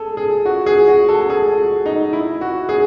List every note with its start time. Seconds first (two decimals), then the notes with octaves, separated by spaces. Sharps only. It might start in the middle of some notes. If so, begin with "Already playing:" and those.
Already playing: G#4 A4
0.17 G#4
0.45 F#4
0.66 G#4
0.88 F#4
1.09 A4
1.21 A4
1.30 G#4
1.57 F#4
1.86 D#4
2.13 E4
2.41 F#4
2.69 G#4